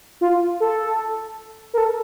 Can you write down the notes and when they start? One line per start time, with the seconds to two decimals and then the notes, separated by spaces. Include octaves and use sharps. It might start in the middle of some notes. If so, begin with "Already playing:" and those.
0.21 F4
0.60 A4
1.74 A#4
1.78 A4